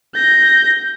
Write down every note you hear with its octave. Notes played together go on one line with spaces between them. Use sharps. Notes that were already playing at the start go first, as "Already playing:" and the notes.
G6 A#6